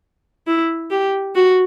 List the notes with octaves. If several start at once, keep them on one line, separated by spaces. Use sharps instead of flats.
E4
G4
F#4